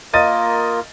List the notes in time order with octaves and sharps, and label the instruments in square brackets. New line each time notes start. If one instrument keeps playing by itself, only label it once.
[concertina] A#3 F4 A#4 [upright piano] D#5 A6 D#7